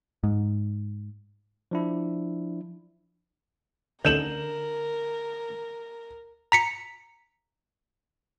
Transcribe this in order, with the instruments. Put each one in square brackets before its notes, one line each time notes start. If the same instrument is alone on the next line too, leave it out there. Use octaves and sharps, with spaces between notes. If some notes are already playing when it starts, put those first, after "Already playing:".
[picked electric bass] G#2
[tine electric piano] F3 D4 E4
[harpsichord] A1 D#4 A4 [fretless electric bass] D3 [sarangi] A#4 [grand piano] G6 E7 F#7
[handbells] A#5 B6 C#7